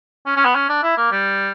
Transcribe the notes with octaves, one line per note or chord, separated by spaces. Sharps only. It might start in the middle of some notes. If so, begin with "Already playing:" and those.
C#4
C#4
B3
C#4
D4
E4
A#3
G3